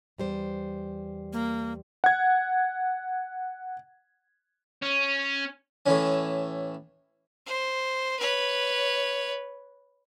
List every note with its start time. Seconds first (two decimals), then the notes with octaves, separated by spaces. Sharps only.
0.18 E2 G3 C5
1.33 A#3
2.04 F#5 G#6
4.82 C#4
5.86 A2 E3 C#4
7.46 C5
8.19 B4 C#5